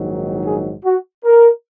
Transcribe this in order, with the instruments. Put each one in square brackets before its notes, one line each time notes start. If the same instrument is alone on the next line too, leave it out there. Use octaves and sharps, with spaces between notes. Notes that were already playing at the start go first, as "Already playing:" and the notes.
Already playing: [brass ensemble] A#1 G#2 D#3 F#3
G#4
F#4
A#4